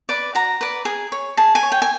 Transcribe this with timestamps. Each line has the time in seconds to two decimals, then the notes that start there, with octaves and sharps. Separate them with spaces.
0.09 B4 D5
0.35 F#4 A#5
0.61 B4 D5
0.85 G#4
1.12 C#5
1.37 G#4 A5
1.55 G#5
1.63 C#5
1.72 G5
1.82 G#5